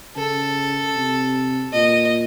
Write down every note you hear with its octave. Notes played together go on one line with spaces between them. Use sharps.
C#3 A4
C3
A#2 D#5